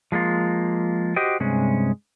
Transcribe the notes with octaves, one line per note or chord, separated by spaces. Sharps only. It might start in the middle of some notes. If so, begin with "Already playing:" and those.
F3 G#3 A#3 F4
F#4 G4 C5 D#5 G5
G2 C3 G#3 C#4